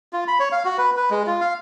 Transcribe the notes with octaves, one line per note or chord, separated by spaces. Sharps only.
F4
B5
C#5
F5
F#4
B4
B4
G#3
F4
F5